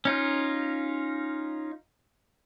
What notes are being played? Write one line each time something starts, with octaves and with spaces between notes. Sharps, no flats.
C#4 D#4 F4